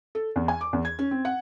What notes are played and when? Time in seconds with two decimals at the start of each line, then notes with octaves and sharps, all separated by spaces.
0.15 A4
0.36 E2
0.48 G#5
0.61 D6
0.73 E2
0.85 G#6
0.99 C#4
1.11 C4
1.25 F#5